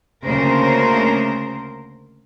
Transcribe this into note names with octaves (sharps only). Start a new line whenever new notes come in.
D2 C#3 A#3 A#4 C5